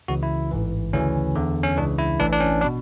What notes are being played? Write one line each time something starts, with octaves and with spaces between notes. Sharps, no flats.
C#2 C#3 E3 F#4
E4
A1 G#2 E3
D2 C#3 E3 C#4
E2 D3
C#4
C#2 C#3 E3 D4
E4
A1 A2 E3 D4
D4
C#4
D4
B2